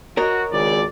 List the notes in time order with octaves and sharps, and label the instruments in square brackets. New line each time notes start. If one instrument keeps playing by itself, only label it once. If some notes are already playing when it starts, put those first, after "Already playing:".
[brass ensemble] F#4 [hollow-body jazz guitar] A#4 C#5 D#5
[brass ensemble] G#1 C#2 D5